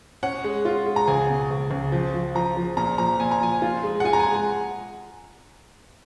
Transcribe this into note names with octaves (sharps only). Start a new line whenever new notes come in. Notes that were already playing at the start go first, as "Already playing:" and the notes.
C#4 F#5
G#3
F4
G#3
A#5
C#2 G#5
B2
C#2
C#2
F3
F3
F3 A#5
F3
A#2 A#5
F3 A#5
A#2 G#5
A#5
F3 G#5
F4
G#3
F#5
F4 G#5
A#5
G#5
G#3
G#5